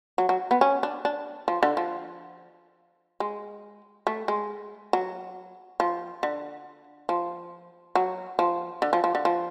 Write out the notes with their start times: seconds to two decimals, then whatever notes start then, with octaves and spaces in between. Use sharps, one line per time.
0.18 F#3
0.29 F#3
0.51 B3
0.61 C#4
0.83 D4
1.05 D4
1.48 F3
1.63 D3
1.77 F3
3.20 G#3
4.07 A3
4.28 G#3
4.93 F#3
5.80 F3
6.23 D3
7.09 F3
7.95 F#3
8.39 F3
8.82 D3
8.93 F3
9.04 F3
9.15 D3
9.25 F3